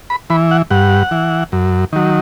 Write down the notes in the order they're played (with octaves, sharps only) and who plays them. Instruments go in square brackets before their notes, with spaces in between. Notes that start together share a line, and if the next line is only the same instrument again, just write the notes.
[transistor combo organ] B5
E3 B5
F#5
G2 F#5
E3
F#2
D#3 F#3